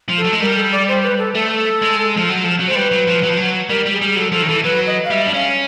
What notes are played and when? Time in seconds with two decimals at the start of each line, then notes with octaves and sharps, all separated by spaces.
0.09 F3
0.18 A4
0.24 F#3
0.32 G#3
0.41 G3 A#4
0.57 A4
0.72 D5
0.88 C5
1.03 B4
1.19 A4
1.34 A3 A4
1.82 G#3
2.17 F3
2.29 F#3
2.44 F3
2.60 F#3
2.68 C5
2.71 G#3
2.75 G3 B4
2.92 F#3
3.07 F3
3.23 F#3
3.29 F3
3.37 F#3
3.69 G3 A#4
3.86 G3
3.93 G#4
4.02 G3
4.16 F#3 A4
4.32 F3 A4
4.42 D#3
4.48 E3 A4
4.64 F#3 B4
4.87 D#5
5.05 F5
5.10 G3 E5
5.27 D4
5.34 C#4 F5